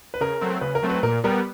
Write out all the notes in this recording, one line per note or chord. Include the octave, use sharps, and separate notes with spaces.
B4
C#3 A#4
F#3 A3 C4
C#3 B4
A#4
F#3 A3 C4
B4
A#2 A#4
G3 B3 A#4